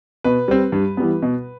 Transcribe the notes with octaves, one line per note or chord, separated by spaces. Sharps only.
B2 B4
G3 C4
G2
E3 G3 B3
B2